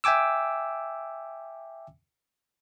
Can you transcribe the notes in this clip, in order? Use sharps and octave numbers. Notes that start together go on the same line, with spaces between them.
E5 G5 G#5 D6 E6